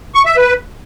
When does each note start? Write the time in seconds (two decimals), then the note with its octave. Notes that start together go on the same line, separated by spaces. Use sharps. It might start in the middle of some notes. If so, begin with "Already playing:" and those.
0.15 C#6
0.26 E5
0.37 B4